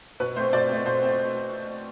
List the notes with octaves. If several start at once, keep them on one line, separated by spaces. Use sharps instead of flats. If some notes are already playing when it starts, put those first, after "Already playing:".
B2 B4
A3 C4 C5
B2 D5
A3 C4
B2 C5
A3 C4